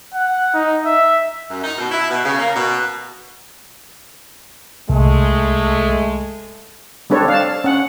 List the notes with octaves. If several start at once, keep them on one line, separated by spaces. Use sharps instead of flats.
F#5
D#4
E5
F#2
D#4
B2
E4
B2
C#3
A#3
B2
C2 G#3 A3
G3 C4 D4 A4 C#5
F5 A5
C#4 F#5